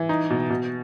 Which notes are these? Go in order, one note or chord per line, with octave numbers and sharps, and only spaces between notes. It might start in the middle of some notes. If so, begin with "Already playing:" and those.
Already playing: E3
D#4
B2
B2